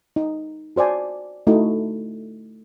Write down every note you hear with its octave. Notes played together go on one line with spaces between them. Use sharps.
D#4
F#4 C5 D5 G#5 A5
A3 D#4 E4 F#4